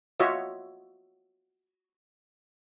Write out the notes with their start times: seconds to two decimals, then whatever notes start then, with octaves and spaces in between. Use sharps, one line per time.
0.20 F4 F#4 C#5 D#5 E5